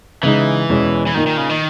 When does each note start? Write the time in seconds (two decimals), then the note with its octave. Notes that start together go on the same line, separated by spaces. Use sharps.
0.23 C#3 E3 G#3 D#4
0.69 E2 B2 G#3 C#4
1.07 E3
1.14 A#2 D#3 A#3 D#4
1.27 D#3
1.37 C#3
1.49 D#3